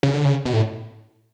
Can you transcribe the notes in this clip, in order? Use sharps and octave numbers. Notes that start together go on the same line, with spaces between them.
C#3
D3
C#3
B2
A2